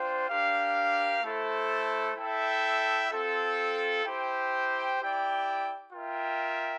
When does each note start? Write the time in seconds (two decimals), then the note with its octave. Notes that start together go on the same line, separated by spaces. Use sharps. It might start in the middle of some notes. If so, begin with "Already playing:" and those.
Already playing: D4 F4 C5 G5
0.28 D4 G4 A#4 F5
1.22 A3 E4 A4 C5
2.16 E4 A4 E5 G5
3.10 C4 F4 A4
4.04 E4 G4 C5 G5
4.99 E4 G4 D5 G5
5.93 F4 A#4 E5 G5